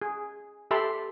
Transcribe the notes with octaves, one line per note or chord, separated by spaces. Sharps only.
G#4
G4 A4 E5 A5 B5 C6